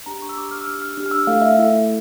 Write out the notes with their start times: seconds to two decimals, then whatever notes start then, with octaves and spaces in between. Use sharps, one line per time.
0.06 D4 G4 A#5
0.22 C#6
0.29 E6
0.37 D4 G4 D6
0.51 F6
0.61 E6
0.67 D4 G4 F6
0.82 F6
0.97 D4 G4
1.06 F6
1.11 E6
1.27 A3 E4 A4 F5
1.41 E5
1.56 A3 E4 A4